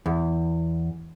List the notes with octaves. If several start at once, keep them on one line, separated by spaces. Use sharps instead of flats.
E2